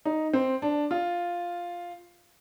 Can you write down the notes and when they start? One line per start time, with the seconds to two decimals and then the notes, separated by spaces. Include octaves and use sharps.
0.05 D#4
0.33 C4
0.62 D4
0.91 F4